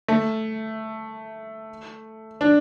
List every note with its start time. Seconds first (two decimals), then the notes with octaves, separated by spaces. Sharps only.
0.08 A3
2.41 D4